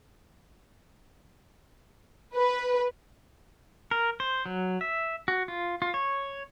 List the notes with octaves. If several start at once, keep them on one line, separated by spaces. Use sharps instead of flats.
B4
A#4
C5
F#3
E5
F#4
F4
F4
C#5